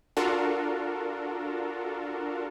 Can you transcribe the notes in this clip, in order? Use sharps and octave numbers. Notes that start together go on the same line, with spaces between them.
D4 F4 F#4 A4 A#4